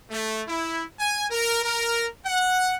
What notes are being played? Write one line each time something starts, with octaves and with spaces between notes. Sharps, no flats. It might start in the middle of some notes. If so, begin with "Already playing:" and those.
A3
E4
G#5
A#4
A#4
F#5